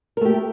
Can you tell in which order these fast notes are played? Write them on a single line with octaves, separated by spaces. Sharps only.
A#4 A3 G4